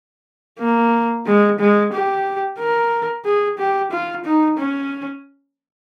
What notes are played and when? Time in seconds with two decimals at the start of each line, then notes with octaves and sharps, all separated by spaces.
0.59 A#3
1.26 G#3
1.59 G#3
1.93 G4
2.59 A#4
3.25 G#4
3.59 G4
3.92 F4
4.25 D#4
4.58 C#4